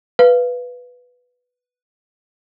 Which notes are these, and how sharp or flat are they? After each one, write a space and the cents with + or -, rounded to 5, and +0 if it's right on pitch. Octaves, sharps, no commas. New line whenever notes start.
B4 +0 F5 -15